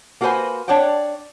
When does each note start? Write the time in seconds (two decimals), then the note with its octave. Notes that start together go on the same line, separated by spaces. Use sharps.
0.21 A#3 F#4 A4 B4 C5 G#5
0.68 D4 C#5 D5 F#5 G5